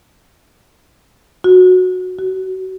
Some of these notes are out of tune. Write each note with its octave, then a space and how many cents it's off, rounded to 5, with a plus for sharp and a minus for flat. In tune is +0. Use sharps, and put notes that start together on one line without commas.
F#4 -10
F#4 +30